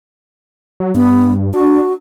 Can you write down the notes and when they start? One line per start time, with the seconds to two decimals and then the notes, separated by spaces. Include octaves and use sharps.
0.80 F#3
0.95 G2 B3
1.54 D4 F#4